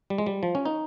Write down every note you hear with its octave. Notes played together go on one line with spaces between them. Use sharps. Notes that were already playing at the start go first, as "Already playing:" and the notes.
G3
G#3
G3
F3
C#4
D#4